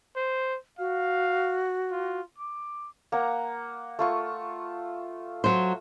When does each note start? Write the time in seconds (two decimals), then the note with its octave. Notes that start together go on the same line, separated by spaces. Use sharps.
0.16 C5
0.79 F#4 F5
1.91 F4
2.38 D6
3.12 A#3 F#5 A#5
3.99 A3 F4 C#6
5.44 F#3 C5